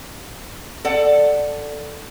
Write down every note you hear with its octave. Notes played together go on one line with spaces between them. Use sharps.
A4 D5 F#5